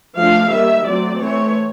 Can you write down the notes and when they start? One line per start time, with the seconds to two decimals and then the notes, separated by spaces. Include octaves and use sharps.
0.15 F3 A3 D4 F5
0.50 D#3 G3 A#3 E5
0.85 F#3 A3 C4 D5
1.21 E3 A3 C4 C#5